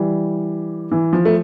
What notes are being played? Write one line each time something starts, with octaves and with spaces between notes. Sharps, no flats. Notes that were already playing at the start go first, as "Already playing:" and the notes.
Already playing: E3 G3
E3
F3
A3